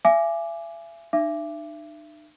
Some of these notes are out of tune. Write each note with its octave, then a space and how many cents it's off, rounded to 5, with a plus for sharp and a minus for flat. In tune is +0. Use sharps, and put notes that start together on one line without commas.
E5 +35 G#5 +0 D6 +5
D#4 -45 E5 +30 D6 +0